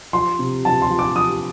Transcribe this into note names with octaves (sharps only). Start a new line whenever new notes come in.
F3 C6
C3
F3 A5
C6
F3
D6
F3 D#6